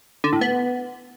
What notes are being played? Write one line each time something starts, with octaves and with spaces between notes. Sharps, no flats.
D3
A2
B3